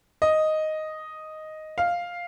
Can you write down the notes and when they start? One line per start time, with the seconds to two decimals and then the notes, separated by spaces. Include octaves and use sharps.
0.22 D#5
1.78 F5